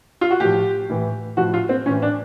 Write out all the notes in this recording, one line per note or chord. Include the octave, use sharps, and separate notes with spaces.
F4
F#4
A2 F3 G4
A2 E3
A2 F3 F#4
F4
C4
A2 E3 C#4
D4